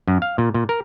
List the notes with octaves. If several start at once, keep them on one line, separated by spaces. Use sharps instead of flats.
F#2
F5
A#2
A#2
A#4